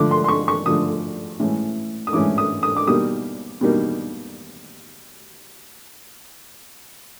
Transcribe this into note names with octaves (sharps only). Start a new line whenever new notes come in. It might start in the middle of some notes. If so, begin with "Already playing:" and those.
Already playing: D3 F3 A3 D6
C6
C6
C#6
C#6
D3 F3 A3 D#6
A2 E3 G#3 C#4
D#6
A2 E3 G#3 C#4 D6
D#6
D#6
D6
B2 G3 A#3 D#4 D#6
B2 G3 A#3 D#4